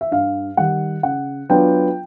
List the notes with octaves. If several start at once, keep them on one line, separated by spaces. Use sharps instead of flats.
E5
G2 F5
D#3 G3 F#5
C#3 F#5
F#3 B3 D4 F4 G5